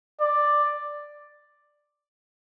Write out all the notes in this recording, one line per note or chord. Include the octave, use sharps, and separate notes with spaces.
D5